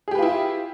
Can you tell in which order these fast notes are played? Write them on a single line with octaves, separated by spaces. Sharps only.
G#4 G4 B4 F4 E4